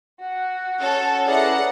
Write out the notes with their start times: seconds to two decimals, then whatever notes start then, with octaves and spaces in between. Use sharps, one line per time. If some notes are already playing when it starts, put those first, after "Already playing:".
0.21 F#4 F#5
0.81 C#4 A4 C#5
1.27 E4 G#4 A4 B4 D5 F#5 A#5